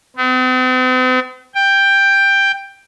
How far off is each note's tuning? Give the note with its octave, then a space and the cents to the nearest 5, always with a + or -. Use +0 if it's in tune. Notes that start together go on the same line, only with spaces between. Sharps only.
C4 -45
G5 +10